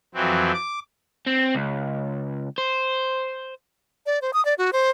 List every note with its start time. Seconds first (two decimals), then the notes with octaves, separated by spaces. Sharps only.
0.14 F2 E3 F#3 C4
0.53 D6
1.26 C4
1.55 C#2
2.58 C5
4.06 D5
4.22 C5
4.33 D#6
4.45 D5
4.58 F#4
4.73 C5